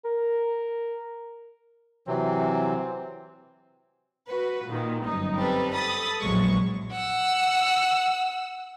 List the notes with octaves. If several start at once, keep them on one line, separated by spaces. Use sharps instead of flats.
A#4
C3 E3 F#3 C4
F#4 B4
A#2 D#3
G1 F#2 D#4
G3 C4 A4 B4
A4 B5 D#6 A6
A#1 E2 F#3 G#3 C#6
F#5 E6